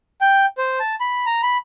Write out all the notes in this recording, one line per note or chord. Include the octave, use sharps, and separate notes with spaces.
G5
C5
A5
B5
A#5
B5